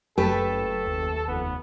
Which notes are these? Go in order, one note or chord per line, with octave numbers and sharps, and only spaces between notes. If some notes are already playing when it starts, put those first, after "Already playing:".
F#1 F#2 A3 G4 A4 B4
D#2
F1 B3